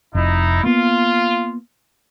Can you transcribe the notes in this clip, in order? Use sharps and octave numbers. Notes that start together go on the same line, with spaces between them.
F1 D#4 E4
A#3 B3 F4